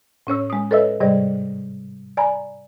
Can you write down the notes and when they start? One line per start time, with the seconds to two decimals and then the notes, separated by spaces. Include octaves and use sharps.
0.27 A2 C#4 C#5 E6
0.50 G#3 D#6
0.71 A4 B4 C#5 D#5 E5 E6
1.00 G#2 C3 G3 G#4 D5 D#5
2.17 D5 G#5 A#5 B5